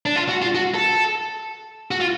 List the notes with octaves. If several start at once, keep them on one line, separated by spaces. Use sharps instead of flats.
D4
F4
F#4
F4
F#4
A4
F#4
F4